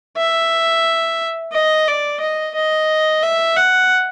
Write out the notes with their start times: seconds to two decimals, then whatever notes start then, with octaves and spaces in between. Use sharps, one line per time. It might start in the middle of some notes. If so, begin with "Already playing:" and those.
0.17 E5
1.53 D#5
1.87 D5
2.21 D#5
2.55 D#5
3.22 E5
3.57 F#5